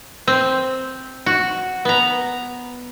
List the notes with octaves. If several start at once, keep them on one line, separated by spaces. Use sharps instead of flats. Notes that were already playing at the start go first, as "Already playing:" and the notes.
C4
F#4
B3 A#5